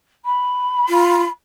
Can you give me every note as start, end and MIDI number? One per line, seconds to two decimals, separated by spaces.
0.25 1.28 83
0.89 1.24 65